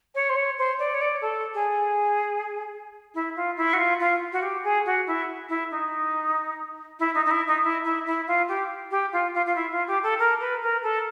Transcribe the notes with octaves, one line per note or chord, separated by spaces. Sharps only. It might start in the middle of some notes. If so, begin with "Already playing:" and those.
C#5
C5
C#5
C5
D5
C#5
D5
A4
G#4
E4
F4
E4
F#4
F4
F4
F#4
G4
G#4
F#4
E4
E4
D#4
E4
D#4
D#4
E4
D#4
E4
E4
E4
F4
G4
G4
F4
F4
F4
E4
F4
G4
A4
A#4
B4
A#4
A4